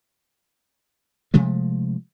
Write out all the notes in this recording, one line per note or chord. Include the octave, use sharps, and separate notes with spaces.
C3 F3 G#3 A3